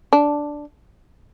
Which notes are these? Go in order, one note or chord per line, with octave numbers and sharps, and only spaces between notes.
D4